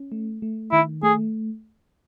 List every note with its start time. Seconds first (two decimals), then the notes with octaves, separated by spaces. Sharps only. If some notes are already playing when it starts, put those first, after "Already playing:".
Already playing: C#4
0.12 A3
0.42 A3
0.72 D#3 E4
1.03 A3 G#4